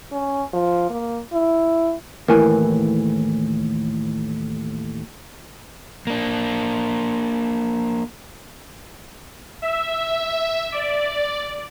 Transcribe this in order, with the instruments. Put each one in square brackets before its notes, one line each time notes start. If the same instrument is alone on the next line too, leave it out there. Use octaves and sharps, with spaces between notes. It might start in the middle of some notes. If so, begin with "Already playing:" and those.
[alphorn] C#4
F3
A#3
E4
[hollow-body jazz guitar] D#2 A2 E3 [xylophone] A#4 G#5
[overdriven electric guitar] A#3 D4
[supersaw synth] E5
D5